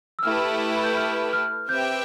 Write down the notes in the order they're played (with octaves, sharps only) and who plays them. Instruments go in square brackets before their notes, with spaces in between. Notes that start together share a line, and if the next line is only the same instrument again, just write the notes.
[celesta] E6
[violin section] A3 E4 G4 B4 [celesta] F6
[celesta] G6
F6
F6
[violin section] C4 G4 B4 E5 G5 [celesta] G6